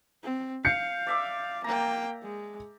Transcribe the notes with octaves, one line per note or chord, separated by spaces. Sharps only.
C4
F5 G6 C7 C#7
D5 E5 D6
A#3 G5 A#5
G#3